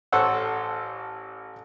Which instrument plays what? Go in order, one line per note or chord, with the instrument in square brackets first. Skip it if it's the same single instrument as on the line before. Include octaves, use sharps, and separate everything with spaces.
[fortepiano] A1 A4 C5 C#5 F#5 E6